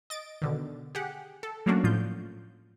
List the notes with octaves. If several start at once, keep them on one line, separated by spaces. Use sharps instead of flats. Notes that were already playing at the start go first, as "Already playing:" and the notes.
D#5 A6 D7
B2 D3 D#3
G4 G#4 F#5
A4
F#3 A3 A#3 C#4 D4 F#4
A2 F3 F4 G6